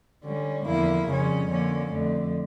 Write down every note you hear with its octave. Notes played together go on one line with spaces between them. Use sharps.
D3 G3 C#4
E2 D3 F3 A#3 E4
F2 C#3 G3 C#4
D3 F3 A#3 C#4
F2 D3 A3